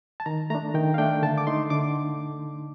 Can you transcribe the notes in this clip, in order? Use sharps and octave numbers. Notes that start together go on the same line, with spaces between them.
A5
D#3 A#5
A3 D4 A#5
D#3 G5
F5
A3 D4 G5
D3 A5
D6
A3 D#4 C6
D3 D6